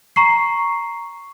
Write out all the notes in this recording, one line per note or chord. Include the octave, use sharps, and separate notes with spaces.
A#5 C#6 C7